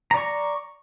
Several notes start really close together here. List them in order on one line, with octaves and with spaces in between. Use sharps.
A#5 D5 C#6